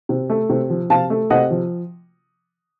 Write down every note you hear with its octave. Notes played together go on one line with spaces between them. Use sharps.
C3
A3
C3
F3
C3 F5 A5
A3
C3 D#5 F#5
F3